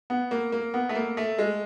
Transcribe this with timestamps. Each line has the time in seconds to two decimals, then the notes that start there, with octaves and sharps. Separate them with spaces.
0.10 B3
0.31 A#3
0.52 A#3
0.74 B3
0.89 A3
0.95 A#3
1.17 A3
1.39 G#3